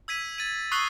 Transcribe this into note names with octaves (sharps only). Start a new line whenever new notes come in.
E6 G#6 B6 D#7
A6 D#7
C#6 D#6 E6 F#6 C7 G7